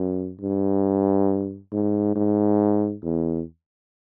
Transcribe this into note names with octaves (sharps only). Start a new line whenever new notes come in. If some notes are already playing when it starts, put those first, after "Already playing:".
Already playing: F#2
G2
G#2
G#2
E2